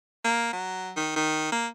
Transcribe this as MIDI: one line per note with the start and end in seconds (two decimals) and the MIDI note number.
0.24 0.51 58
0.53 0.91 54
0.97 1.12 51
1.16 1.49 51
1.52 1.67 58